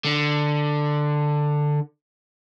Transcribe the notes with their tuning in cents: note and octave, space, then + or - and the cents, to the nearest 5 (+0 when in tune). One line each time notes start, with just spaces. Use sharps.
D3 +10